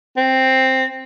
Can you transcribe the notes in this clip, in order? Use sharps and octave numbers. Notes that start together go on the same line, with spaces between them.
C4